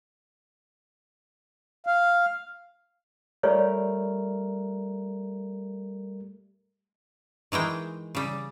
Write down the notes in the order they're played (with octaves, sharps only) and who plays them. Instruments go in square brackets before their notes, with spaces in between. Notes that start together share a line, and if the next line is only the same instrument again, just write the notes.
[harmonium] F5
[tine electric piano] G3 A3 A#4 [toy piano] C#5 D5
[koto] D#3 E3 G#3 G5
C#3 G3